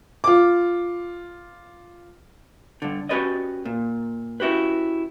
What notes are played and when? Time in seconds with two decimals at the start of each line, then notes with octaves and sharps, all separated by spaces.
0.24 F4 D6
2.82 G2 D3
3.09 C#4 F#4 G4 B4 D5 D#5
3.65 A#2
4.40 C#4 E4 F#4 G4 B4